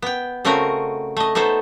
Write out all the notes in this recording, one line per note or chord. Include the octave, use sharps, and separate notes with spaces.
B3 G5
C#3 A3 C4 F#4 A#4 D#5
A3 D#5
A3 B3 D#4 A4 C5